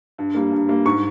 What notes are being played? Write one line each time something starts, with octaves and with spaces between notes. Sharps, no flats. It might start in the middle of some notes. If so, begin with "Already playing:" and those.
G2
G3 A#3
G2
G3 A#3
G#2 C#6